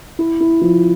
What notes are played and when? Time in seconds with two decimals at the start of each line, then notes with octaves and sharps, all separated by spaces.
0.19 E4
0.41 E4
0.61 F3